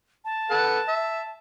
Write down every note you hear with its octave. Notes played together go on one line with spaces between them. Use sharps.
A5
A4 B4 F#5
E5